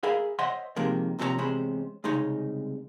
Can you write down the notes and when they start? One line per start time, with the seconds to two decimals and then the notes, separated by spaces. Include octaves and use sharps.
0.03 G#4 A#4 E5 F5 B5
0.39 C5 C#5 D#5 E5 F#5 C6
0.76 C3 D#3 F3 G#3 A#3
1.19 D#2 C3 F3 A4 C#5 A#5
1.38 E2 C3 G#3 C#4 C5 B5
2.04 C2 C#3 G#3 D#4 C#5